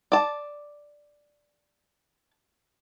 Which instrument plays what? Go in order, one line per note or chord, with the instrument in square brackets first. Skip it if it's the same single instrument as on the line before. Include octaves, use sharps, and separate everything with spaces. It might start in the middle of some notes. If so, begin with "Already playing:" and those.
[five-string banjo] D5 A5